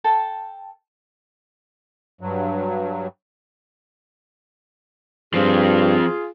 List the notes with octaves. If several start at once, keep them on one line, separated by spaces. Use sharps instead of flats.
A4 G5 A5
G2 F#3
G2 F3 C4 F4 G#4